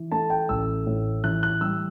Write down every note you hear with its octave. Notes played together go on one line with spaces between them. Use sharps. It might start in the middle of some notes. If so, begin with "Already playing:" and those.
Already playing: E3
A3 A5
G5
A1 E6
A2
E3 F#6
F#6
G3 E6